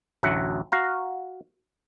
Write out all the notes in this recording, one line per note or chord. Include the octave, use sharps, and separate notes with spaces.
A1 D2 F#3 E5 F#5
F#4 F5 A#5